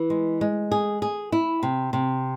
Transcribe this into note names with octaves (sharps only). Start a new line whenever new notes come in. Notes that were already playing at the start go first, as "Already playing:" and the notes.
Already playing: E3
G#3
G#3
G#4
G#4
E4
C3
C3